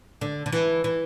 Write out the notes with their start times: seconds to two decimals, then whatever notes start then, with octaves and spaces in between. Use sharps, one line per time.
0.21 D3
0.46 D3
0.52 E3
0.84 E3